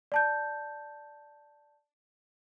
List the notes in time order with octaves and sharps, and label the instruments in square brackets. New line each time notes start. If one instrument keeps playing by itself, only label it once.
[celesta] D5 A5 G6